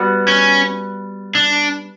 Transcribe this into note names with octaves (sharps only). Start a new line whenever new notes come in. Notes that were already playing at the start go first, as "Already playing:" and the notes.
Already playing: G3 B3 F#4
C#4
D4